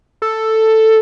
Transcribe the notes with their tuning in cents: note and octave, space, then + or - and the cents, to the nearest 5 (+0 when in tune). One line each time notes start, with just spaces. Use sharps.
A4 +5